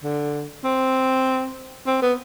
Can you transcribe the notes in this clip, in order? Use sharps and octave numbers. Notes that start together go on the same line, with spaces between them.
D3
C4
C4
B3